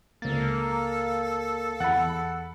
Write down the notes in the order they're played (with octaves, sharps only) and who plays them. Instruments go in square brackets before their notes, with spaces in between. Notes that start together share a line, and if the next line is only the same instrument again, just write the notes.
[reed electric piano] C#2 A6 [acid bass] A#3 [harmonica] A4
[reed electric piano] E2 A6 [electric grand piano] F#5 B5